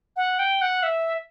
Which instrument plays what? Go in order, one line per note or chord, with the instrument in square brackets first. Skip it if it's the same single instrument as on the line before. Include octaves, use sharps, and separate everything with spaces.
[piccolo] F#5
G5
F#5
E5